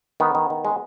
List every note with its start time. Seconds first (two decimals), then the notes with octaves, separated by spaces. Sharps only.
0.20 D#3 B3
0.35 D#3
0.50 D#3
0.65 G#3